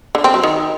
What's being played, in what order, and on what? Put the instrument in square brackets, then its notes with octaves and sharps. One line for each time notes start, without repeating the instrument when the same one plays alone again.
[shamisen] D3
C4
F#3
D#3